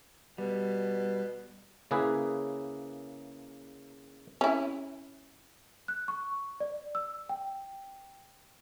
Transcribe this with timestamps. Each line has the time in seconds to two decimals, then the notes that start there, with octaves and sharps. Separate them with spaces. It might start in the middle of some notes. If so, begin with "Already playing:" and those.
0.38 B2 G3
1.91 C#3 A#3 E4 G#4 B4
4.41 C#4 E4
5.88 F#6
6.08 C#6
6.60 D5
6.95 E6
7.29 G5